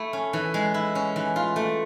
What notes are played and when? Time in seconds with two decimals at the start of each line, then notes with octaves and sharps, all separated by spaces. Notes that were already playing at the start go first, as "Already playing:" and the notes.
Already playing: A3 E4
0.13 C#4
0.33 E3
0.54 G#3
0.74 E4
0.95 C#4
1.16 E3
1.36 F4
1.56 A3